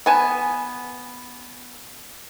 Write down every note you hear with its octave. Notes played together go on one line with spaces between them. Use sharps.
B3 G#5 A5